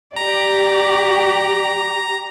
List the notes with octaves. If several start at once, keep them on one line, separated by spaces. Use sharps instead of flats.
G4 D5 A#5